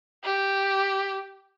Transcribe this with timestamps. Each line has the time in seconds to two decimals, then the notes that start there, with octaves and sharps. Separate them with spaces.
0.24 G4